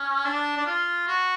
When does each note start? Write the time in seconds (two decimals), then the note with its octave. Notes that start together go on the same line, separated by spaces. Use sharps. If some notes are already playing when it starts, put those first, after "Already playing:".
Already playing: C#4
0.25 D4
0.57 D4
0.66 F4
1.08 F#4